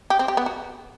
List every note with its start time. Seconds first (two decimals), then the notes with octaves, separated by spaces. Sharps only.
0.10 G4
0.19 C4
0.28 G4
0.37 B3
0.46 F#4